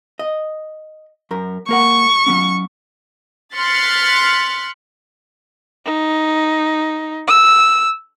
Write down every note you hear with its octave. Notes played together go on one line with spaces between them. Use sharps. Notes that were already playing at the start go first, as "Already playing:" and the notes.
D#5
F#2 A#4
A#3 A#4 F#5 C#6
F#3 B3 C#4
C6 F6 F#6 A6 B6 C#7
D#4
E6